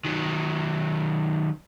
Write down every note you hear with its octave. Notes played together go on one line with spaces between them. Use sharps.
D#3 F#3